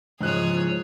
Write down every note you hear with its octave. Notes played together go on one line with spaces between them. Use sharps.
C#2 G#2 E3 F3 G#4 C#5 F#6